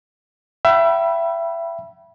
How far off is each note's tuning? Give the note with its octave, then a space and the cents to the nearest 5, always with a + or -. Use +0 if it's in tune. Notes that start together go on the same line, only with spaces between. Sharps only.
E5 +25 G5 -40 B5 -15